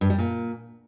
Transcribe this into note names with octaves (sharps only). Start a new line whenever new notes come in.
G2
G3
A#2